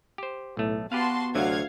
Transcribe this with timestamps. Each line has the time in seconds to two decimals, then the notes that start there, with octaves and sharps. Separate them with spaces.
0.18 G4 C5
0.57 B1 A2 A3
0.92 B3 F#4 G4 B4 F5 A5 C6
1.35 D2 C3 F#3 F5 F#5 G#6